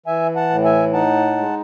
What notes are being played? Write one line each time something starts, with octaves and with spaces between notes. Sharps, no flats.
E3 E5 G#5
F#5 A5
A2
E5 G#5
D#4 F#5 A5
G#3